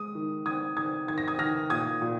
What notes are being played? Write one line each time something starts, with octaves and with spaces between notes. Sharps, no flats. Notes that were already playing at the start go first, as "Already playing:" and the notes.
Already playing: G#3 D#6
D#3
D#3 D#6 G#6
D#3 D#6 G#6
D#3 G#6
A#6
D#6 G#6
D#3 F6 A#6
A#2 D#6 G#6
A#2